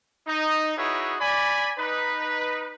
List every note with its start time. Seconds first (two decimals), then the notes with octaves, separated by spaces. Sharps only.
0.28 D#4
0.78 D#4 E4 F#4 G#4 B4 C#5
1.20 D5 G#5 B5
1.79 D#4 B4